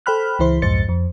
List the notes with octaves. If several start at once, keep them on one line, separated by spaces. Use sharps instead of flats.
A4 C5 G5 B5 F6 F#6
C#2 E3 E4 C5 C6
C2 F2 G#2 C5 A6 C#7
F2